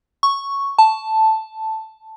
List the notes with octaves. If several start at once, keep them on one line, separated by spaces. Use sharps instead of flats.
C#6
A5